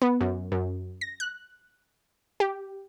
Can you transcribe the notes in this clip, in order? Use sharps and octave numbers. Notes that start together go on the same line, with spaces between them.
B3
F#2
F#2
A#6
F#6
G4